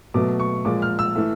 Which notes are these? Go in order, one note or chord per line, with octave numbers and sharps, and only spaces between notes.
B2 F#3 A3 D6
C#6
A#2 F3 G#3 D6
F6
E6
E3 A3